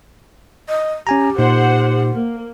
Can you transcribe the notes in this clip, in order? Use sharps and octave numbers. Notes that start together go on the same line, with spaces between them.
D#5
C#4 G4 G#5 A#5
A#2 A#3 D#4 C5 F#5
A#3